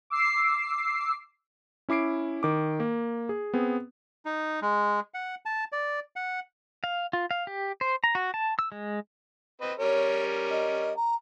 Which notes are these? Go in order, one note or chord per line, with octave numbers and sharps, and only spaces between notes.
D6 E6 C7
C#4 E4 D6 C7 D7
D#3 D6
A#3
G#4
B3 C4 G#4
D#4
G#3
F#5
A5
D5
F#5
F5
F4
F5
G4
C5
A#5
F#4
A5
E6
G#3
C4 B4 D#5
G3 C#4 A#4 C#5
D#5
A#5